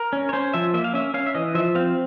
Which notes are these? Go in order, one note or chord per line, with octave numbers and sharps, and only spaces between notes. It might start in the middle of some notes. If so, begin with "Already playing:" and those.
Already playing: A#4
C#4
C#5
C#4 C5
F3 E5
A#3 E5
F5
C#4 E5
C#4 F5
E5
E3 D#5
F3 E5
C4 F5